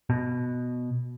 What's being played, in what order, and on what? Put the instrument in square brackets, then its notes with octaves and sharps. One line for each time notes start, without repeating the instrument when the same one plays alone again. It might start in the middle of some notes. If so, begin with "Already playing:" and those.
[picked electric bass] B2